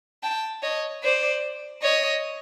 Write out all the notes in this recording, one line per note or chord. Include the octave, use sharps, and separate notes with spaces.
G5 A5
C#5 D#5
C5 D5
C#5 D#5